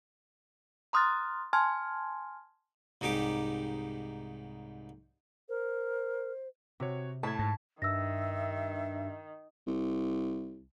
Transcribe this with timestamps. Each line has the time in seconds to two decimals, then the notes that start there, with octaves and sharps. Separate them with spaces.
0.93 A#5 C6 D#6 F6 F#6 A6
1.53 G#5 A5 C6 F6 G#6
3.01 C2 G#2 D#4 G4 D6
5.49 A#4 C5
6.80 C3 C4 F#4 C#5
7.23 A2 A5 B5 G#6
7.39 G#2
7.82 G2 D#3 E5 E6 A#6
9.67 C2